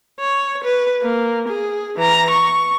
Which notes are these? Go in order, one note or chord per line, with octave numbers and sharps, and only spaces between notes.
C#5
B4
A#3
G#4
E3 A#5
C#6